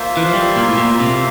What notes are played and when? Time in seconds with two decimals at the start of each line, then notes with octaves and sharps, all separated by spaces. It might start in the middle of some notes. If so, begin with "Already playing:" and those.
Already playing: A#3 F4 C5 E5
0.17 E3
0.26 F3
0.33 G3
0.56 A#2
0.69 A2
0.77 A#2
1.00 C3